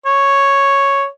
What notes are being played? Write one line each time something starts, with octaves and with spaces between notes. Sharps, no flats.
C#5